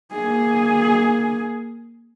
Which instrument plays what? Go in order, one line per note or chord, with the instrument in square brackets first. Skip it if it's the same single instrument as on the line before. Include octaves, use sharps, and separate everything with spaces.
[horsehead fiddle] A#3 G#4